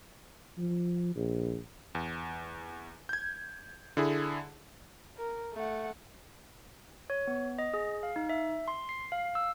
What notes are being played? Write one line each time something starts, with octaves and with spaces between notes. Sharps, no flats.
F3
A#1
E2
G6 G#6
D3 E4 G#4
A#4
A3 F#5
C#5
B3
D#5
G#4
F5
D#4
E5
C6
C7
F5
E6